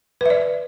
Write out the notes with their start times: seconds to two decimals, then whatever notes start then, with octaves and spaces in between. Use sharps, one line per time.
0.21 B4
0.26 E5
0.30 D5